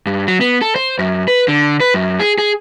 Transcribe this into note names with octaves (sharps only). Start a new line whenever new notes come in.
G2
F#3
B3
A4
C5
F#2
B4
D3
B4
F#2
G#4
G#4